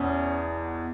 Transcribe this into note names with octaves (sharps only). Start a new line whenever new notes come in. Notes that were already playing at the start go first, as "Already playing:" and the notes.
Already playing: E2 B2 C#4